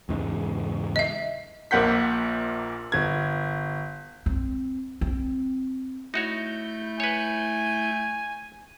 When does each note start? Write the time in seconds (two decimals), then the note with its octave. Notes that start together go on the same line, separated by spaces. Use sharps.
0.09 E2 G#2 C#3
0.96 D#5 E5
1.71 A#1 A#2 A#3 F#5 G6 B6
2.92 G1 G#6
4.26 C4
5.01 C4
6.14 A3 D#4 E4 F#4 C#5 G6
7.00 B4 C#5 G#5